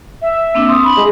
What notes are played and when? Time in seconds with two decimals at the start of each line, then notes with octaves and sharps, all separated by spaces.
0.22 E5
0.55 A#3 C4 D4
0.68 C6 D#6
0.85 B5
0.97 G#3